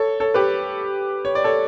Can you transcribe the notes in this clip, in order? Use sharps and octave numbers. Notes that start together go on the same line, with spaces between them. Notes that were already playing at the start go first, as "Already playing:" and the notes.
Already playing: A4 C#5
A4 C#5
G4 B4
C#5
D5
A4 C#5